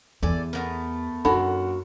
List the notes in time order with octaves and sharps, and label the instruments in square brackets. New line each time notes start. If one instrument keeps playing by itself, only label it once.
[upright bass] E2 [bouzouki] A4 D5 G#5
[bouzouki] A3 B3 A#4
[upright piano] F#2 F#5 [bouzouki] A#3 F#4 [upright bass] D4 [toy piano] D#4 A4 B5